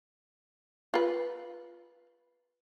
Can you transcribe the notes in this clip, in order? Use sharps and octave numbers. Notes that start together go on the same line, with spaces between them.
F4 B4